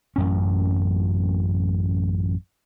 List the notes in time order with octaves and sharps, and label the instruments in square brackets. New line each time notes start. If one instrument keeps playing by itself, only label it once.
[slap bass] A1 F#2 C#4